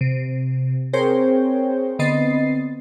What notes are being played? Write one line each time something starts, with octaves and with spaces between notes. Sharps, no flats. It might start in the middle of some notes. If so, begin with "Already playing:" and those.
C3
C4 G#4 A#4 C5 C#5 G5
D3 B3 C4 D#5 A6 C7